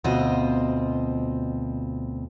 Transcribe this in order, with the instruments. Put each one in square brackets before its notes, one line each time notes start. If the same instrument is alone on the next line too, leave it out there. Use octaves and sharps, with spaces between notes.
[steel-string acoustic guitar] D2 B2 C4 F4 D#5